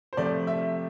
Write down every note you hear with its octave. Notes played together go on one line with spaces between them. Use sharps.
C5
C3 F3 A3 D5
E5